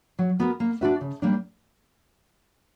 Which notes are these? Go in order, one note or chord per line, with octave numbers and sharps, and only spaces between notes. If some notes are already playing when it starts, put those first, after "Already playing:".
F#3
B3 F#4 A#4
A#3
D4 F#4 B4 E5
C#3
G3 A#3 D4